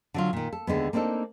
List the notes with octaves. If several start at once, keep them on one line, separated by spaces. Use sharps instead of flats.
D3 F#3 F4
A#2 D#3
A4
D#2 D3 G#3 B3
A#3 C4 D4 D#4 A4